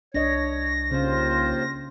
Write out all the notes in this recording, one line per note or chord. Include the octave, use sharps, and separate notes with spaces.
C2 D4 C#5 D#5 A#6
D#2 C#3 C#4 F4 C5